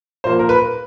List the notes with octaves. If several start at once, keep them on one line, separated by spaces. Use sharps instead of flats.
A#2 F3 A#3 C5
A#4
B4